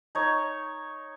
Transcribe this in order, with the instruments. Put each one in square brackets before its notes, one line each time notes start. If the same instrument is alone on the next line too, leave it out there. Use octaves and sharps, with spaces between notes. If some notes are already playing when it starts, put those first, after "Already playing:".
[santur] D#4 C#5